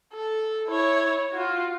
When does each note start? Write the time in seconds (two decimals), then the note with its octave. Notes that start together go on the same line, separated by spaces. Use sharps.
0.13 A4
0.68 E4 C#5
1.32 F4 F#4